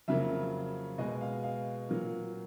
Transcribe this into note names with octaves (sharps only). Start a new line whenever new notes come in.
F2 C#3 F#3 A#3 E5
B2 G#3 B3 D#5
F5
F5
A#2 F#3 A#3